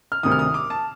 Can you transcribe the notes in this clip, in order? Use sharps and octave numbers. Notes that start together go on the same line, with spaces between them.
F6
D2 C3 D#3 D#6
F6
D#6
D6
A5